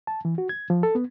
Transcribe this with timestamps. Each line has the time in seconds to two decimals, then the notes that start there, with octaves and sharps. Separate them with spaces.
0.07 A5
0.25 E3
0.38 F#4
0.49 G#6
0.70 F3
0.83 A4
0.95 B3